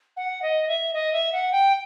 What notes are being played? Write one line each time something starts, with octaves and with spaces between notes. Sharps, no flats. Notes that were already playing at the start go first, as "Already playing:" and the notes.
F#5
D#5
E5
D#5
E5
F#5
G5